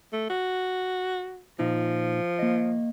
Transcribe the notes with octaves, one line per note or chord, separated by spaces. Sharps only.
A3
F#4
A#2 F3 D#4
A#3 D#5